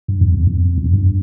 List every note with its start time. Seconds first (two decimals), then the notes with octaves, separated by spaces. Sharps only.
0.08 G2
0.21 F2
0.34 E2
0.47 F2
0.78 E2
0.86 F2
0.94 G2